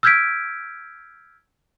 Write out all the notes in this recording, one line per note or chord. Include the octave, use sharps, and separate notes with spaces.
E6 F6 G6 G#6 B6 D7